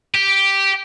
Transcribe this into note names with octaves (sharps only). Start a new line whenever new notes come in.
G4